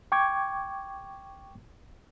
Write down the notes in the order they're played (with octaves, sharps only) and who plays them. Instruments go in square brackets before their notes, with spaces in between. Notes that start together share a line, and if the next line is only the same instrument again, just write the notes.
[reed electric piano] G5 C#6 D6 G#6